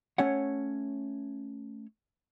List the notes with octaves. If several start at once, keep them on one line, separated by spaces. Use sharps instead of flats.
A3 C#4 C#5 F#5